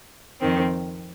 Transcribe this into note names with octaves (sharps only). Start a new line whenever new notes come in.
F2 D#3 C4